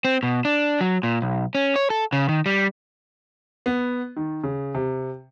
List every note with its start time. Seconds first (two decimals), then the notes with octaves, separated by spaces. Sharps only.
0.05 C4
0.23 B2
0.45 D4
0.81 F#3
1.03 A#2
1.22 B1
1.55 C#4
1.76 C#5
1.90 A4
2.13 C#3
2.29 D#3
2.46 G3
3.66 B3
4.17 D#3
4.44 C#3
4.75 C3